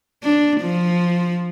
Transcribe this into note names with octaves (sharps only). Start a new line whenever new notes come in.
D4
F3